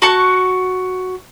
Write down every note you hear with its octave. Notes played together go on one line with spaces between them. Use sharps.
F#4 A5 C#6